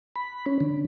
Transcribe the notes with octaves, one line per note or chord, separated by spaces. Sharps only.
B5
C#4
D3